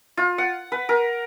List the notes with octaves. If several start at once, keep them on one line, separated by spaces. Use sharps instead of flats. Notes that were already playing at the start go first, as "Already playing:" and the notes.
F4
F#5
B4
A#4